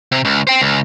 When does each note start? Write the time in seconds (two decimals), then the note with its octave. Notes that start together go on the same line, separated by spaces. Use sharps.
0.12 C3
0.25 C#2
0.47 C5 G5
0.62 C#2